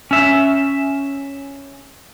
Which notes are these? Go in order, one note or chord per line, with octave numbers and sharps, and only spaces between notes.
C#4 E5